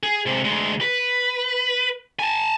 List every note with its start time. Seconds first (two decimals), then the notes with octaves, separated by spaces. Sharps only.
0.03 G#4
0.26 C3 G#3
0.45 D2 G#3
0.81 B4
2.19 G#5 A5